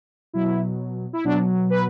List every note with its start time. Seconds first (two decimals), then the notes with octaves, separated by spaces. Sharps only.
0.33 B2 F#3 E4
1.13 E4
1.24 B2 F#3 D4
1.70 B4